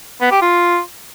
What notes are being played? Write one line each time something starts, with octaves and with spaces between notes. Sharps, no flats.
B3
G4
F4